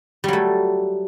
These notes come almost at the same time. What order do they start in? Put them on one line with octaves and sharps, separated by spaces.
G3 F#3 A3